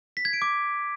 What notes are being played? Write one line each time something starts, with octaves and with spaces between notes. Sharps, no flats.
B6
G#6
D7
D6